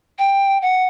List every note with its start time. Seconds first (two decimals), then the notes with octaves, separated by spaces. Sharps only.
0.19 G5
0.62 F#5